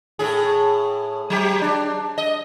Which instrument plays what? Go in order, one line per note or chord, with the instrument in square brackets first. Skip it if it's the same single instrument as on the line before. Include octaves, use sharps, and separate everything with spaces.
[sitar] A2 G#4
F#3 G4
D4
D#5